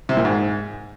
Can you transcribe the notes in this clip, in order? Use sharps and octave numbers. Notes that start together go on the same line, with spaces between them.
C3
A#2
G#2